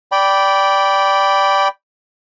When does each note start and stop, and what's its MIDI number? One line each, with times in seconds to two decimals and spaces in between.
0.12 1.68 74
0.12 1.68 79
0.12 1.68 83